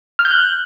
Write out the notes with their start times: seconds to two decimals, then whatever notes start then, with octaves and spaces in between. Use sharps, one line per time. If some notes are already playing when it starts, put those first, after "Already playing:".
0.19 F6
0.25 G6
0.31 F#6